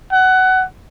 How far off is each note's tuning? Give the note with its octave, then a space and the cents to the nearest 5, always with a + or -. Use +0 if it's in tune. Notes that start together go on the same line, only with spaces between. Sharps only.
F#5 +20